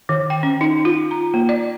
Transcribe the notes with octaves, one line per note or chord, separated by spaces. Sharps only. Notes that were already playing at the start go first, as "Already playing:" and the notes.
D#3
G5
C#4
D#4
F4
A#5
A#3
D5